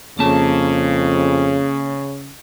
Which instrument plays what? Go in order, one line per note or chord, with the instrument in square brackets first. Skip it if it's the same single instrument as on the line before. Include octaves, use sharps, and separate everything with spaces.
[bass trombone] F2 [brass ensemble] C#3 [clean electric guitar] A#3 A5